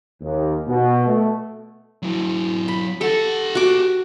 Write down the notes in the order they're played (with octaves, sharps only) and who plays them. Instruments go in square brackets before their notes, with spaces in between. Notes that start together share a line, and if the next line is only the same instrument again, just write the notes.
[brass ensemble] D#2
B2
A3
[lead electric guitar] F#3 E4
[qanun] B5
[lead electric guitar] G4 F#5 [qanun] A4
[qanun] F#4 D6